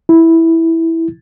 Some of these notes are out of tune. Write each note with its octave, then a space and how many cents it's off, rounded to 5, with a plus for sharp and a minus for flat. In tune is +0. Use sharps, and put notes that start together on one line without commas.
E4 -5